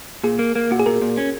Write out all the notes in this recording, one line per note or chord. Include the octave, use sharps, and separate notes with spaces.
A#2 G#4
A#3
A#3
A#2 F#4
G#4
A#2 A#4
A#2
C#4